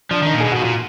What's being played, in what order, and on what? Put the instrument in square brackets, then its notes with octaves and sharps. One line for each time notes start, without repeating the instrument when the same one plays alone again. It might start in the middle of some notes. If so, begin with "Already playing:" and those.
[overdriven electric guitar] F3 [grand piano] D4
[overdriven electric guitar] D#3 [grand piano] D#4
[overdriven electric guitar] A#2
[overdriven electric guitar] B2 [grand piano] G#4
[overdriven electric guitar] B2 [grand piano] F#4
[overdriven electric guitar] A#2 [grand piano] F4